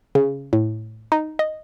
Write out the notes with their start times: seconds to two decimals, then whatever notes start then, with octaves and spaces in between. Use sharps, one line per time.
0.15 C#3
0.53 A2
1.12 D#4
1.39 D#5